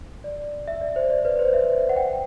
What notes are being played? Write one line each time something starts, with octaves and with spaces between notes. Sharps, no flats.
D5
E5
D5
C5
D5
B4
C5
E5
F#5
G5